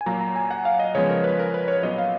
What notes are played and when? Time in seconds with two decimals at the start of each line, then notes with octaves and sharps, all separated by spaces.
0.01 G#5
0.06 A#2 F#3 A#3 A#5
0.21 A#5
0.36 G#5
0.51 F#5
0.65 F5
0.79 D#5
0.95 C#3 F3 G#3 B3 C#5
1.09 A#4
1.24 B4
1.39 A#4
1.54 B4
1.68 C#5
1.83 A#2 F#3 B3 D#5
1.98 F5